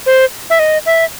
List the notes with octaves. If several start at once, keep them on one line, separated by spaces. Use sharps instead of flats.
C5
E5
D#5
E5